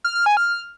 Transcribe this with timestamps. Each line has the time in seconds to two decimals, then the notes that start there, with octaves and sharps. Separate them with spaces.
0.04 F6
0.15 F6
0.26 G#5
0.37 F6